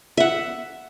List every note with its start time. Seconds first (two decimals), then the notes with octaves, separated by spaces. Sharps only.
0.17 E5 F#5